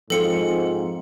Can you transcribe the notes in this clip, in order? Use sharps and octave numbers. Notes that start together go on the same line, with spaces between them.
G#2 F3 C4 F4 A4 C#7